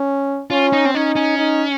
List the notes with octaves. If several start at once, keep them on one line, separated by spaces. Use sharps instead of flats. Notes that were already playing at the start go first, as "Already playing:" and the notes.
Already playing: C#4
C#4 F4
D#4
C4
C#4 D#4
C#4
D#4